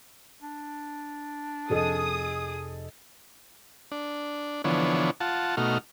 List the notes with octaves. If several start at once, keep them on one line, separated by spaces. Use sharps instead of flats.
D4
F1 G#4 A4 D#5 D#6
D4
D3 E3 F3 B3 D4 C#5
F4 F#5 A5
B2 A3 D#4 F#4 F6